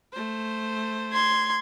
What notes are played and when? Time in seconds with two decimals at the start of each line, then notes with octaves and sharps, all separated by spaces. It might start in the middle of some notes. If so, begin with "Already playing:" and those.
0.13 A3 C5
1.12 C6 G#6